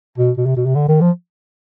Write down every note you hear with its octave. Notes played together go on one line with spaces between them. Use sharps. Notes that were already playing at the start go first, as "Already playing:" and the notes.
B2
B2
C3
B2
C3
D3
D#3
F3